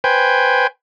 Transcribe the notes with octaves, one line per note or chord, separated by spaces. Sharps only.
B4 C5 G5 G#5